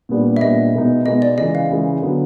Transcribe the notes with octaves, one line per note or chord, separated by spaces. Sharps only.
A#2 G3 B3 D4
E5
A#2 G3 B3 D4 D#5
B2 G#3 B3 D#4
B2 G#3 B3 D#4 D#5
D5
C#3 E3 G#3 D#5
F5
C#3 E3 G#3
D3 F#3 B3